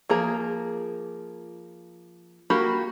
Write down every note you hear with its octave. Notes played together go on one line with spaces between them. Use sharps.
F3 A#3 G#4 A#5
A#3 F#4 G4 B5